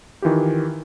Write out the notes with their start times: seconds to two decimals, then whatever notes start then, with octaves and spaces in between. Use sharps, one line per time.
0.22 D#3 E3 F4 G4